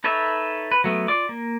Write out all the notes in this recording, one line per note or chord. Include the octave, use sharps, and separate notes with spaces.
D#4 A4 B4 C#5 E5
B4
F#3 A3 B3
F4 D5 D6
A#3